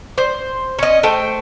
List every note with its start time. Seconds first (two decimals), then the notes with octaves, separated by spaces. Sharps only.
0.18 C5
0.79 C#4 D#5
1.03 A3 C5 G5